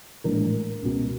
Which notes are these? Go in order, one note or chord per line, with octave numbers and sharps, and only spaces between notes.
A#1 A2 E3 G#3 A#4
C#2 B2 G#3